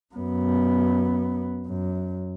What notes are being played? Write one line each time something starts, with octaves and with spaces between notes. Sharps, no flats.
F#2 B3
F#2